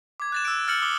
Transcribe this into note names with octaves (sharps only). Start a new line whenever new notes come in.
D6 G#6
F#6 A6 E7
E6 D7
F6 A6 C#7 F#7
D6 D#6 G7